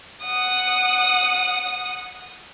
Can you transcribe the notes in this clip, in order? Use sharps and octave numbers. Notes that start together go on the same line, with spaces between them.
F#5 D#6